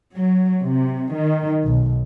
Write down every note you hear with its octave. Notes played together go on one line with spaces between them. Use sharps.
F#3
C3
D#3
B1